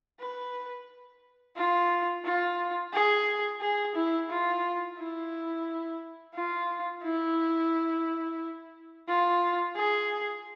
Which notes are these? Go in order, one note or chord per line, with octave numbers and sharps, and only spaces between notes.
B4
F4
F4
G#4
G#4
E4
F4
E4
F4
E4
F4
G#4